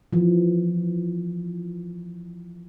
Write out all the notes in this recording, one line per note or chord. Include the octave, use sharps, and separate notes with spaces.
E3 F3